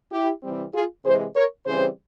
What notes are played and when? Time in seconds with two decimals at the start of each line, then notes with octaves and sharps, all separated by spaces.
0.12 E4 G4
0.43 C3 E3 G3 C4
0.74 F4 G#4
1.04 C3 E3 G#3 G#4 C5
1.35 A#4 C#5
1.66 C#3 E3 G3 C4 G#4 C5